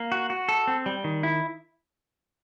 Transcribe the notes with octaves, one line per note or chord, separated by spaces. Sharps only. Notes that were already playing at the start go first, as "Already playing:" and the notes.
Already playing: A#3
F#4
F#4
A4
C4
G3
D#3
E4